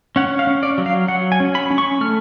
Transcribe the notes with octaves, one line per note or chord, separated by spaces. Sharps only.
C#4 F#5
F5
C#4
D5
F#3
F5
F#3 F#5
G#5
C#4
B5
C#4
C#6
A3 F6